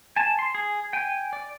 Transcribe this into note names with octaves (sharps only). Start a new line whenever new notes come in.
G#5 A5
C6
G#4
G5 G#5
D5